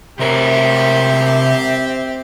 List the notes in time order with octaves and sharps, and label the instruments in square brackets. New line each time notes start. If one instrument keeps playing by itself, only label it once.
[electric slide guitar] C3 A#4 C#5 [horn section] C4 G4 [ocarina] E5